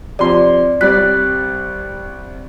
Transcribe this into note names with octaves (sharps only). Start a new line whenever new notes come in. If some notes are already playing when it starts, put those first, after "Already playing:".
C3 F3 D5 C6
C2 G3 D5 F#6 B6